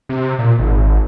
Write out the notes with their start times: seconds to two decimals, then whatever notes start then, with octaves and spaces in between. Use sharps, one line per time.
0.09 C3
0.39 A#2
0.59 G#1